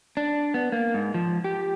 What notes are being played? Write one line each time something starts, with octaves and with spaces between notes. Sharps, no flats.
D4
B3
A#3
G#2
F3
G4